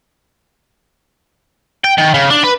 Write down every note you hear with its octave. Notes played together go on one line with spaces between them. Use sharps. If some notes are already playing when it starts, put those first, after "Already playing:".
G5
D#3
C#3
D4
B4